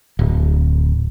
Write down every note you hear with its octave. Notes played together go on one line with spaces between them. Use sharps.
D1